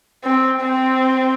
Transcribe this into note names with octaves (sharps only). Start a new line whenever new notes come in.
C4
C4